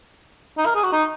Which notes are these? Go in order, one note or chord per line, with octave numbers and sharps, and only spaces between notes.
D#4
A#4
G#4
F#4
D#4